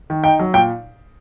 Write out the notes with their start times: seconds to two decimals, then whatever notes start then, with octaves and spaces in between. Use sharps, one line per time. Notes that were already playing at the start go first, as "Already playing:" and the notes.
0.10 D#3
0.24 D#4 G5
0.39 F#3
0.54 A#2 G5